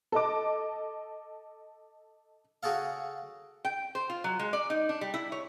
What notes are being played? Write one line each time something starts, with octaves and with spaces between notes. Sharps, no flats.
A4 D#5 D6
C#3 F#4 G#4 A4 F5
G5
C5
F4
F#3
G#3
D5
D#4
D4
G3
E4
C#5